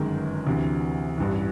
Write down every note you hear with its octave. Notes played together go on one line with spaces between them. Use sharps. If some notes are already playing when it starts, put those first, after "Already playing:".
Already playing: G1 F#2 D#3 G#3
D2 C3 E3
A1 G2 E3